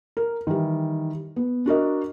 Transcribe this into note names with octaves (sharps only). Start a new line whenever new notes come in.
A#4
D#3 E3 G3
B3
D4 F#4 A#4 D#5